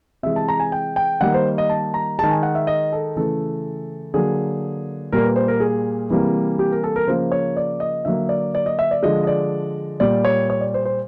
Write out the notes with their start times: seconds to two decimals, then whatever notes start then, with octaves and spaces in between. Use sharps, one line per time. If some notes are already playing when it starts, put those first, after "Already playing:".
0.23 C3 E3 G#3 E5
0.36 A5
0.49 A#5
0.60 G#5
0.72 G5
0.96 G5
1.21 D#3 G3 A#3 F#5
1.34 C5
1.58 D#5
1.70 A5
1.94 A#5
2.19 D#3 G#3 A5
2.31 G#5
2.43 F#5
2.55 E5
2.67 D#5
2.93 A4
3.16 C#3 E3 A3 A4
4.14 D3 F#3 A#3 G#4
5.12 A#2 G3 A#3 A#4
5.25 B4
5.36 C5
5.48 A#4
5.60 G#4
6.10 C3 E3 G3 A#3
6.59 G4
6.72 A#4
6.84 A4
6.96 A#4
7.07 C#3 F3 A#3 C5
7.32 C#5
7.57 D5
7.80 D#5
8.05 D3 F#3 A#3 E5
8.29 D5
8.55 D5
8.66 D#5
8.79 E5
8.91 D5
9.03 D3 F3 G#3 D#5
9.23 D#5
9.27 D5
10.00 A#2 G3 A#3 D5
10.25 C#5
10.50 C#5
10.61 D5
10.74 C5
10.85 C5